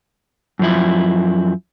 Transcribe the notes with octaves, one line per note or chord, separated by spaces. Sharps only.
F#2 F3 E4